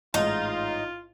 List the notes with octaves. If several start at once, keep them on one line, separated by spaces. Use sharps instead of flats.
A1 G#2 D#4 F4